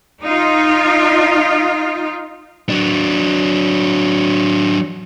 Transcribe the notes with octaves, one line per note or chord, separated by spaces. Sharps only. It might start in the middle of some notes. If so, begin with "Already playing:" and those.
D#4 F4
F#3 D4